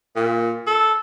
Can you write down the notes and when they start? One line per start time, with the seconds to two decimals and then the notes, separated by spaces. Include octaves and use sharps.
0.16 A#2
0.67 A4